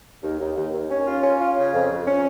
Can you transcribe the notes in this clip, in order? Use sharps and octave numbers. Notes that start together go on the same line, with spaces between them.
D#2
D#2
D#2
D#2
C#4
F4
C#4
F4
C#3
F2
F2
C#4